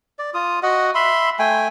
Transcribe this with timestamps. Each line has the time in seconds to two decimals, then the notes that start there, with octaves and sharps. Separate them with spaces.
0.19 D5
0.34 F4 D#6
0.63 F#4 D#5 F#5
0.95 E5 B5 C6
1.39 A3 G5 G#5